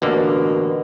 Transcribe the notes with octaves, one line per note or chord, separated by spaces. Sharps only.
A1 B2 D3 A#3